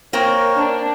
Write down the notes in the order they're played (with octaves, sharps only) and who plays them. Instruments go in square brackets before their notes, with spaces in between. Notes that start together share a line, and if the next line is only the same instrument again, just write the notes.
[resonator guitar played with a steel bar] A#3 C4 [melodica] A#4 C#5
[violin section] D4